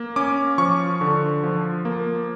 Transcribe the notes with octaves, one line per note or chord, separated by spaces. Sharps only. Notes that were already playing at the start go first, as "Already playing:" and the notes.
Already playing: A#3
C#4 D6
F3 C#6
D3
F3
A#3